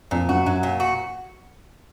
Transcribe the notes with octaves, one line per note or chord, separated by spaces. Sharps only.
F2 A#2
F#2 F#4
F#2 F#3
A#2
F#4